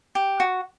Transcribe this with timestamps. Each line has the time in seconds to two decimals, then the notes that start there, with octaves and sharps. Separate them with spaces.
0.15 G4
0.40 F#4